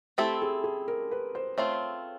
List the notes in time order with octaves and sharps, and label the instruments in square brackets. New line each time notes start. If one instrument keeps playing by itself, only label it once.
[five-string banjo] A3 C4 E4 A4 [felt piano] G4
[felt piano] G#4
G#4
A#4
B4
C5
[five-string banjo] A3 C4 F4 [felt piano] C#5